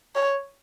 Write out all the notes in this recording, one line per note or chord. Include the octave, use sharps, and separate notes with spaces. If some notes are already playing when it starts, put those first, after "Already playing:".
C#5